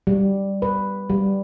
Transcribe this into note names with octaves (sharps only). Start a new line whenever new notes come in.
G3
B4
G3